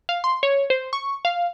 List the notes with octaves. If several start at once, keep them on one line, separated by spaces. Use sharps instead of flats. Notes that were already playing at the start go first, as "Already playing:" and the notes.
F5
C6
C#5
C5
C#6
F5